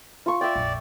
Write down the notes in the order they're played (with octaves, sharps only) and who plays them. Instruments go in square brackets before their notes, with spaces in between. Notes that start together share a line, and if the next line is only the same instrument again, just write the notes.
[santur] F4 C#6
[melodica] D5 [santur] E5 G5
[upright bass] A#1 F2